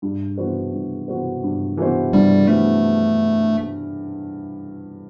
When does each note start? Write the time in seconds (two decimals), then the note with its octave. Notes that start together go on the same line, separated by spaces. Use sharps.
0.02 G2
0.37 E3 B3 F#4 C5
0.73 G2
1.08 E3 B3 F#4 C5
1.43 G2
1.77 E3 B3 F#4 C5
2.13 G2 G3
2.47 E3 A3 B3 F#4 C5